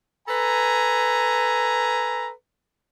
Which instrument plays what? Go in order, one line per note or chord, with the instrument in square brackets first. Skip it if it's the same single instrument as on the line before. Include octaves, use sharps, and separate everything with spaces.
[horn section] A4 B4 G#5 A#5